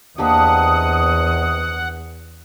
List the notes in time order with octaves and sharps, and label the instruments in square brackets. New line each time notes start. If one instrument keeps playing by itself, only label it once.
[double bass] E2 [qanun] A#3 D4 G4 [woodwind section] C4 D#5 D#6 [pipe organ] F#5